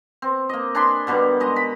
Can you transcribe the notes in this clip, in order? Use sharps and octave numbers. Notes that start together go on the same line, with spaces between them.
C4
A#3 D#5
D4 G#5 B5 C6
B2 D3 D#3 G3
G#3 D#5
B5